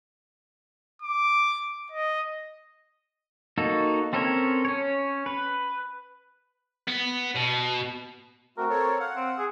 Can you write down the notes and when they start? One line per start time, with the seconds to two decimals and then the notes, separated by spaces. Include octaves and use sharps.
1.02 D6
1.92 D#5
3.58 A#3 D#4 F#4 A4
4.13 C4 C#4 A4 A#4 C#5
4.65 C#4 C#5
5.26 B4
6.88 B3
7.36 B2
8.58 A3 C4 F#4 A#4
8.70 C4 A4 C#5
9.00 F5 F#5
9.16 C4
9.38 G#4